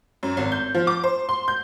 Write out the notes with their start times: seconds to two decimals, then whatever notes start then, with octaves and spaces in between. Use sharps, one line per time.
0.23 F#2
0.37 G#1
0.52 G6
0.74 F3
0.87 D6
1.04 C5
1.29 C6
1.48 G6